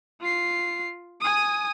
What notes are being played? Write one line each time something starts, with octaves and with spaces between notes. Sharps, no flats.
F4 C7
G#5 D#6